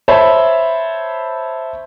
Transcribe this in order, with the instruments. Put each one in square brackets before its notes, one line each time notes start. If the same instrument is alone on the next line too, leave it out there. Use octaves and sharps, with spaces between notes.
[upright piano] C5 C#5 E5 A5 B5